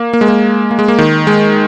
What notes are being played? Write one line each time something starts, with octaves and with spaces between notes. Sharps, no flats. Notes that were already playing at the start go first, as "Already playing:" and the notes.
Already playing: A#3
A#3
G#3
A#3
A#3
G#3
A#3
D#3
G#3